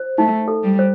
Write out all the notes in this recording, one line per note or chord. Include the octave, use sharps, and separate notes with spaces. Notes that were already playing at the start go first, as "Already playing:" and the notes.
Already playing: C5
A3 D#4
A4
G3
C5